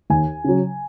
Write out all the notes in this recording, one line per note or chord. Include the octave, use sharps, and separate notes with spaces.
D#2 G#5
C#3 F#3